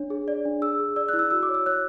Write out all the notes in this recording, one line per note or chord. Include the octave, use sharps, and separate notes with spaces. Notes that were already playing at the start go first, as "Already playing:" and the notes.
Already playing: D4 C#5
G#4
D5
D4
G#4 E6
G#4
D5 E6
E4 F#6
E6
F#4 E6
D6
C#5
E6
C#5 F#6